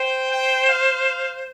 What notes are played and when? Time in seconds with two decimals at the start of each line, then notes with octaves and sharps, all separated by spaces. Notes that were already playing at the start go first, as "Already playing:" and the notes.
Already playing: C5 G5
0.31 G5
0.69 F5